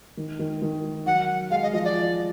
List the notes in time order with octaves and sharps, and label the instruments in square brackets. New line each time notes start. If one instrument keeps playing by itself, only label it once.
[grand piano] D#3
D#3
D#3
[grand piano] F#3 [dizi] F#5
[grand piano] G#3 [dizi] F5
[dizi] D#5
[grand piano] F3 [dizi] D#5
[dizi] D5